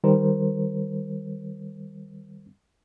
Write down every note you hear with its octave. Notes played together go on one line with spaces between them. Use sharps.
D#3 G3 A#4 C5